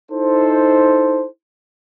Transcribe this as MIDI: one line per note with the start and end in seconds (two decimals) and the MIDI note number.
0.11 1.26 63
0.11 1.26 64
0.11 1.26 69
0.11 1.26 72